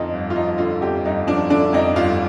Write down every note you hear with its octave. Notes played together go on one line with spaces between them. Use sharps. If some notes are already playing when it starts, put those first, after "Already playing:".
Already playing: F2 D3 F3 D#4 F4
G1
F4
F3 D#4
D3 F4
F2 G4
G1 D#4
F3 D4
D3 D4
F2 D#4
G1 F4